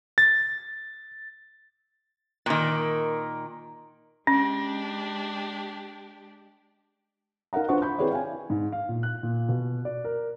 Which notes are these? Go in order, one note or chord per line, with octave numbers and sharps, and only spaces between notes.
A6
A#2 D#3
G#3 C#4 D4 G4
D#4 A#4 F5 F#5 A#5
D4 F4 B4 C5 F#5 C#6
B5 C#6 G6
C4 E4 G#4 B4 C#5 D5
F5 G5 G#5
G#2
F5
A#2
F#6
A#2
B2
D5
A#4